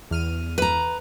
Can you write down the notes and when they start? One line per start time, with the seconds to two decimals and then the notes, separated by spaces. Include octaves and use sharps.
0.11 E2 F6 D#7
0.58 B4 A#5